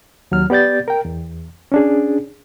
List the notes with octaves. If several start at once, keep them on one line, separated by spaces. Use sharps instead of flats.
D#2 F#3 F6
B3 G4 D5 G6 A6
A#4 G5
E2
C#4 D4 G#4